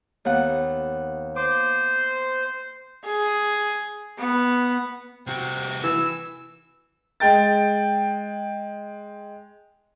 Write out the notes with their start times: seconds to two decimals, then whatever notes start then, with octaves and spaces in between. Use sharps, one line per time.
0.25 D#2 B3 F#5
1.36 C5 D6
3.05 G#4
4.18 B3
5.27 C2 C3 F#4
5.84 E3 E6
7.20 G#3 G5 A6